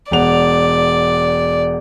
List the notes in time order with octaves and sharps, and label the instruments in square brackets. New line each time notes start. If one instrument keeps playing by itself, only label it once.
[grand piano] E1 F#5 F7 [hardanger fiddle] D5